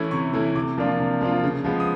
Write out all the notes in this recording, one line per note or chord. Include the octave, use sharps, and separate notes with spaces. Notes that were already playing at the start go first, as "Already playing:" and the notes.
Already playing: E3 A3 C#4 E4
C3 C#6
E3 A3 C#4 E4
C3 D6
F3 A#3 D4 F4
C3
F3 A#3 D4 F4
C#3
F3 G#3 B3
D#6